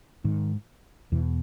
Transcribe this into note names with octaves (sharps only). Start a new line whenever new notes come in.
G#2 D#3
E2 B2 E3